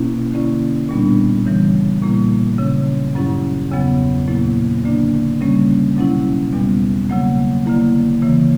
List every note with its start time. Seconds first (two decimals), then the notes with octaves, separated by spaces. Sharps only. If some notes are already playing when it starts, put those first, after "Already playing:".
Already playing: B2 A#3 C#4 E4
0.33 D3 A#3 C#4 E4
0.89 A#2 G3 B3 D4
1.46 C#3 E3 G3
2.02 A#2 G3 A#3 E4
2.59 C#3 F#3 C#4
3.15 G2 F#3 C#4 E4
3.71 E2 C#3 F#3 B3
4.28 A#2 F#3 A#3 E4
4.84 D3 A#3 D4
5.41 C#3 G3 A#3 C#4
5.97 B2 F#3 C#4 E4
6.53 E2 B2 G3 B3
7.10 C#3 F#3 A#3
7.66 D3 A#3 E4
8.22 C#3 E3 A#3